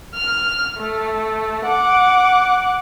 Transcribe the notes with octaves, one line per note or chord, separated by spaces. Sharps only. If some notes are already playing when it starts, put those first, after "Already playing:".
F6
A3
F#5 D6